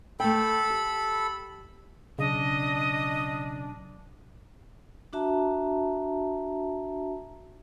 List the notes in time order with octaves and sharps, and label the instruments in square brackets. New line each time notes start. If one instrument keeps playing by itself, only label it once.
[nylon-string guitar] A3 G5 [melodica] A4 B5
[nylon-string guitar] G4
[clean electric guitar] B1 [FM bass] C#3 [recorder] D4 [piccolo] D#5
[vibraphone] D4 F#4 E5 A5 A#5